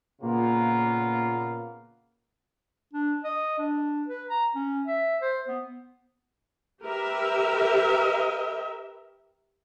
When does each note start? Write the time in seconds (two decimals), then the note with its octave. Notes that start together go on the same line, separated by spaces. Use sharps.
0.22 A#2 C#3 A#3 B3 F4
2.93 D4
3.24 D#5
3.59 D4
4.08 B4
4.30 A#5
4.55 C#4
4.87 E5
5.22 C5
5.48 B3
6.84 G4 A#4 B4 E5